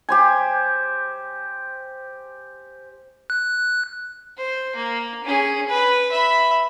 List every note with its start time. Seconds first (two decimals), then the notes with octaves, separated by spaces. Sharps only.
0.09 G4 C5 G#5
3.30 F#6
4.38 C5
4.76 A#3
5.24 C#4 G#4
5.69 B4
6.11 E5 B5